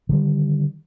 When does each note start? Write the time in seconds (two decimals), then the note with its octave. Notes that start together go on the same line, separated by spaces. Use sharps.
0.09 D3 D#3 G3